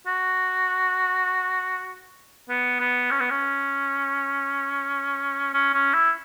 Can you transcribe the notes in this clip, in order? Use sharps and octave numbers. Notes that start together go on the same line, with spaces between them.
F#4
B3
B3
C#4
B3
C#4
C#4
C#4
E4